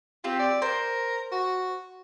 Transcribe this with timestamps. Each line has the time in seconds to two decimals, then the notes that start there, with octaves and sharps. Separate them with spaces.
0.24 C4 F4 G4
0.39 D5
0.62 A#4 C5
1.32 F#4